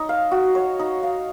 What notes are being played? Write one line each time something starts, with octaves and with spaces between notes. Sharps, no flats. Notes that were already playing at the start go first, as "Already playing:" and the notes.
Already playing: D#4 C#5
F5
F#4
C#5
D#4
F5